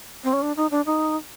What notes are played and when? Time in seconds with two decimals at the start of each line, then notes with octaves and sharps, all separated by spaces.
0.24 C4
0.33 C#4
0.42 D4
0.57 D#4
0.71 D4
0.86 D#4